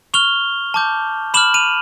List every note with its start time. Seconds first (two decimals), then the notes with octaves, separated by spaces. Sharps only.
0.14 C#6 F6 F7 G7
0.74 A5 D6 G6
1.34 B5 D6 F6 E7 F#7
1.54 D#7 F7